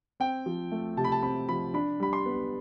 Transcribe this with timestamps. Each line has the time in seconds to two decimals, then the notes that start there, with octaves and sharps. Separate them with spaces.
0.20 C4 G5
0.46 F3
0.72 A3
0.97 C3 A5
1.04 B5
1.12 A5
1.23 C4 B5
1.49 F3 B5
1.74 D4 B5
2.00 G3 B5
2.13 C6
2.26 B3